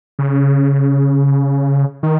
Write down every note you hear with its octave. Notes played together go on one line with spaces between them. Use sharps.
C#3
D#3